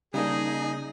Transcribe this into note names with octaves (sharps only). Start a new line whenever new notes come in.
C#3 G3 A#3 D4 D#4 G#4